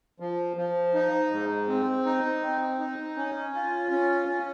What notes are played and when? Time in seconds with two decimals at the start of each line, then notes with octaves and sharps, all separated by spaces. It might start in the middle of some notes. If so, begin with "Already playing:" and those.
0.20 F3
0.57 F3
0.94 D#4
1.31 G#2
1.68 C4
2.05 D#4
2.43 C4
2.79 D#4
3.17 C#4
3.55 F4
3.91 C#4
4.28 C#4